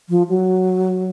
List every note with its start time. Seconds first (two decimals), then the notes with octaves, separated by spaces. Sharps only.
0.09 F3
0.29 F#3